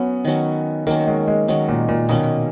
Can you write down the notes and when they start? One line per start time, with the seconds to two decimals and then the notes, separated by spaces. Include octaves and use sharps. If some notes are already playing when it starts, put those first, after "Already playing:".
Already playing: F#3 B3 C#4
0.25 D#3 F#3 C#4
0.87 D#3 F#3 A#3 C#4
1.07 G#3
1.27 G#3
1.48 D#3 F#3 G#3 C#4
1.69 A#2
1.89 A#2
2.09 B2 D#3 A#3 C#4